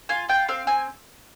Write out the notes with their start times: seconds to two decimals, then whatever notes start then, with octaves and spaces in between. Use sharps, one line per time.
0.09 F4 G#5
0.29 F4 G5
0.48 C4 F5
0.67 C4 G#5